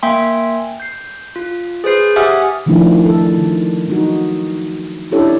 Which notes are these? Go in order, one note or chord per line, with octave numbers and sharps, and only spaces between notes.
A#3 E5 G5 G#5 C6
G6 C7
F4
G#4 B4 C5 C7
G4 E5 F#5 G#5 D#6 F6
D#3 F3 A3 D4 E4
A4
D#3
F#3 D#4 F#4
C#4 D4 E4 G4 A4 C#5